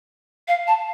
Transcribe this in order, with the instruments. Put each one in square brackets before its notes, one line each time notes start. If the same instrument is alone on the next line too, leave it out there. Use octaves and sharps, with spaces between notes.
[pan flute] F5
A5